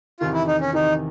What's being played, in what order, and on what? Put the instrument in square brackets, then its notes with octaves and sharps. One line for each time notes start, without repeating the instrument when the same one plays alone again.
[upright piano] E2 C3 D#3 [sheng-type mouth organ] F4
[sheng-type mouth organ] E4
D#4
C#4
[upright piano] E2 C3 D#3 [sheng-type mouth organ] D#4